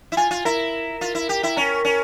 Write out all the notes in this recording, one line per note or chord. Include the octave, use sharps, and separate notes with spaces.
E4
F4 G#5
F4
E4 A#4
F4
E4
G4
E4
C#4 A#4
C#4